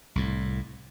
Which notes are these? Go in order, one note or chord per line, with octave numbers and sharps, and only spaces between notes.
C2 A2